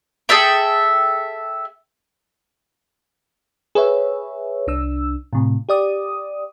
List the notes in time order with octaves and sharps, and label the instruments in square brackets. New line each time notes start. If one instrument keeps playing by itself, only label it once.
[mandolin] G#4 A4 E5 G5
[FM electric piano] G#4 B4 C#5 E5
C2 D4 E6
A2 C3
G4 D5 D#6